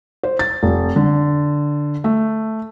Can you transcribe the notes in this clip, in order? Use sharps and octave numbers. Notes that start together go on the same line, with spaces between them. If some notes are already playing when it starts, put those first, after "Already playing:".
C5
A6
F1
D3
A3